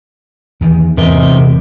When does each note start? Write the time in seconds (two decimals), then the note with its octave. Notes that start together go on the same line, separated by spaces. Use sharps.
0.61 E2 D#3
0.97 E2 G#2 C3 A#4 D#5